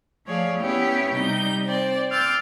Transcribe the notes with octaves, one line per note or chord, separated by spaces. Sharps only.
F3 A3 G#4 C#5 D5 F5
B3 C#4 E4 G4 C#5
C3 G3 D#4 G6
C4 D5
C6 D6 E6 F6 G6 A6